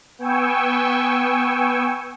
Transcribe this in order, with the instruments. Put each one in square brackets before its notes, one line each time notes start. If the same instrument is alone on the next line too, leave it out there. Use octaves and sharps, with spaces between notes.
[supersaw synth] B3 G5 G#5 C#6 E6